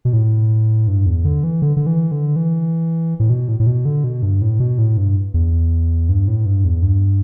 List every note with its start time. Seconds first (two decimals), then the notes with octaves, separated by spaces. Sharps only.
0.05 B2
0.13 A2
0.88 G2
1.06 E2
1.25 D3
1.44 E3
1.62 D3
1.77 D3
1.86 E3
2.12 D3
2.36 E3
3.20 A2
3.30 B2
3.48 A2
3.60 A2
3.67 B2
3.85 D3
4.04 B2
4.23 G2
4.42 A2
4.60 B2
4.78 A2
4.97 G2
5.34 E2
6.09 G2
6.28 A2
6.46 G2
6.65 E2
6.82 G2